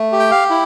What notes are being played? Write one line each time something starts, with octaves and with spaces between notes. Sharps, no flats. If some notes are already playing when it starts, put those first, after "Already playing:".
Already playing: A3
G4
G5
F5
E4